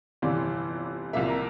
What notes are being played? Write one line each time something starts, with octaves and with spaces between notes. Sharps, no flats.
G1 F2 C3 E3 D5
C2 C3 F3 A#3 E5
A#4